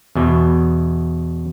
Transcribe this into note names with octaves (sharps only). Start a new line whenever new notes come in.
E2 B2